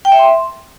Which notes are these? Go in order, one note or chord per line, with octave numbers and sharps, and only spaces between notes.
G5
E5
C6